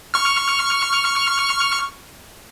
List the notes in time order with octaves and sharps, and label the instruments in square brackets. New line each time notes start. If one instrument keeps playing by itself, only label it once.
[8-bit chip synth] C#6 F6